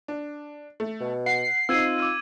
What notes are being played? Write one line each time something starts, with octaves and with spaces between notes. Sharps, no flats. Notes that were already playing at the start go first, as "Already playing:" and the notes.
D4
A3
B2
F#5 C7
C4 D#4 F4 E6 G#6 D#7
D6 E6 D#7